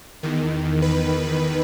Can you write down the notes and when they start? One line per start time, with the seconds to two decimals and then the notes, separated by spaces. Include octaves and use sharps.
0.23 E2 D#3
0.82 B4